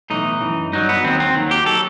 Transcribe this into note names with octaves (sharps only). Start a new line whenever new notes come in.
B1 A2 E3 D#4
F#2 E3
G2 F#3 D#4
B3
D#2 D#3 F#3 C4
C4
D#2 D#3 F#3
G4
F#3 A4